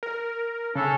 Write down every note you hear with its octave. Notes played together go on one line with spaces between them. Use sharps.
A#4
C#3 C#4 D4 A4